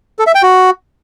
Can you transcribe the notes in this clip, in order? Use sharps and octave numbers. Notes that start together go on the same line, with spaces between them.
A4
E5
G5
F#4